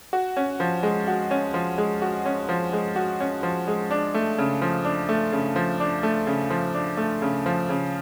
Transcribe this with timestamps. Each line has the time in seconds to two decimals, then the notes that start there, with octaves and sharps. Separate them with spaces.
0.13 F#4
0.37 C#4
0.60 F3
0.83 G#3
1.08 F#4
1.31 C#4
1.54 F3
1.78 G#3
2.02 F#4
2.25 C#4
2.49 F3
2.73 G#3
2.96 F#4
3.20 C#4
3.43 F3
3.68 G#3
3.91 D4
4.14 A3
4.38 C#3
4.62 F3
4.85 D4
5.09 A3
5.32 C#3
5.56 F3
5.80 D4
6.03 A3
6.27 C#3
6.50 F3
6.74 D4
6.97 A3
7.22 C#3
7.46 F3
7.69 C#3